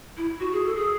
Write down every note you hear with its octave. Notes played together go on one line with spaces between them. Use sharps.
E4
F#4
G#4
A4
G#4